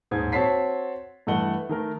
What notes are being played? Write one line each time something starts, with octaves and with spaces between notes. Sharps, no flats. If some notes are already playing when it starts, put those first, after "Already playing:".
D#1 G#2 G#6
C4 F#4 C#5 A5 B6 C7
G2 E3 A3 D#5 F#5 G7
D#3 A3 A#4